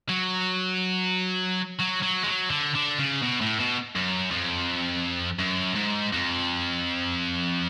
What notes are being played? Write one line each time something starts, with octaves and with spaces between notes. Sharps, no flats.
F#3
F#3
F#3
G#3
F#3
D3
D3
C#3
B2
A2
B2
F#2
F2
F#2
G#2
F2